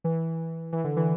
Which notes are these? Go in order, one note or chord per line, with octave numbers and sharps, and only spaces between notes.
E3
E3
D3
E3